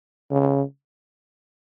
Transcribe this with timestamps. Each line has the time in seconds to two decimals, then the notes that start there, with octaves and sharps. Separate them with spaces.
0.31 C#3